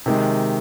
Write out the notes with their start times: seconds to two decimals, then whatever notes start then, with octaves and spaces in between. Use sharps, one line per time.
0.06 C3 D#3 G#3